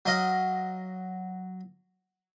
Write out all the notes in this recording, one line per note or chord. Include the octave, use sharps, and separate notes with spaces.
F#3 D#5 F5